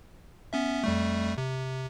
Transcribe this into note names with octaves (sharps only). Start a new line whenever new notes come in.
B3 C#4 E5
F2 G3 A3
C3